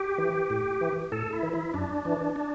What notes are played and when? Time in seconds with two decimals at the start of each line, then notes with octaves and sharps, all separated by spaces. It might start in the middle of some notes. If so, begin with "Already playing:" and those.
Already playing: G4
0.18 E3
0.50 A2
0.81 E3
1.12 A2 A4
1.33 E4
1.43 E3
1.53 E4
1.74 F#2 D4
2.05 E3
2.36 D4